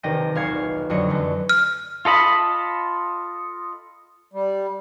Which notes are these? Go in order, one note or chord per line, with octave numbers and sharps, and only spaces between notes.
E1 C3 D#3 G5 A#6 D#7
D#1 B1 F5 G#6 C7 C#7
F2 D3 F#3 D#5 C#7
F#2 E3 A3
F6
F4 A4 D#5 B5
G3